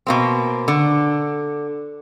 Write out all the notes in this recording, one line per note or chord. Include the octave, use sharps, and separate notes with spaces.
B2 A#3 C4
D3